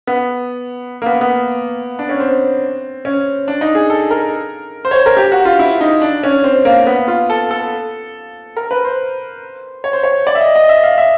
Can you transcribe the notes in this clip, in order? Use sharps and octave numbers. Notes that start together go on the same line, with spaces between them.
B3
A#3
B3
B3
D4
C#4
C4
C#4
D4
D#4
G#4
A4
A#4
C5
C#5
C5
A#4
G4
F#4
F4
E4
D#4
D4
C#4
C4
A#3
B3
F4
A4
A4
A#4
B4
C5
C#5
C5
C#5
D5
E5
D#5
D#5
E5
F5
E5